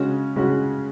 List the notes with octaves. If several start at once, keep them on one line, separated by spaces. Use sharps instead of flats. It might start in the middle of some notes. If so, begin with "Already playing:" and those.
Already playing: C#3 G#3 C#4 F#4
C#3 G#3 C#4 F#4